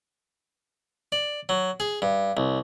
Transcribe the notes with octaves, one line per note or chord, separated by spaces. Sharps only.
D5
F#3
G#4
G2
C2